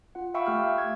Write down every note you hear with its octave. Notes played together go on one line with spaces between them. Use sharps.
F4 F#5
E5 F5 G5 B5 C#6 E6
A3 G4 F6 G6
G#6